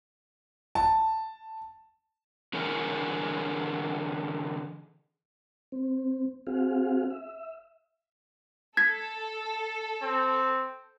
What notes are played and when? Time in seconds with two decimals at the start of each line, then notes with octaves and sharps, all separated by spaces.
0.75 A5
2.53 D3 E3 G#4 A#4 C#5
5.72 C4
6.47 C4 F#4 G#4 F5
7.10 E5
8.77 A4 G#6 B6
10.02 C4